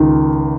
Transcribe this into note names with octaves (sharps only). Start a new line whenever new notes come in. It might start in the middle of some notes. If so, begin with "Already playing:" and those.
Already playing: C#2 D#3